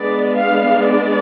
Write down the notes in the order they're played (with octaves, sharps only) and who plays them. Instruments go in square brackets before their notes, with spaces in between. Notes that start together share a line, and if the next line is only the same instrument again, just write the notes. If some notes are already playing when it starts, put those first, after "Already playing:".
Already playing: [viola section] G#3 B3 D4 D5
F5
D5